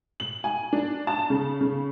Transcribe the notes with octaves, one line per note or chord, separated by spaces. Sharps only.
F#7
G#5
D4
A5
C#3
C#3